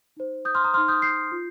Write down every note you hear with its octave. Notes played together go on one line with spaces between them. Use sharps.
D#4 C5
D#6 G6
C6 F6
A#5 D#6
D#4 C5 C6 F6
D#6 G6
G6 C7
F4